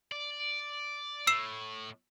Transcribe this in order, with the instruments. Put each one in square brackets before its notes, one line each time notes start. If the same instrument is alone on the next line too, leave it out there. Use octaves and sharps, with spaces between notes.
[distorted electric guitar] D5
[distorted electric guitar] A2 [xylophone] E6 C7 E7